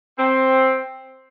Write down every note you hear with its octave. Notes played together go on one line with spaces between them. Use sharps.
C4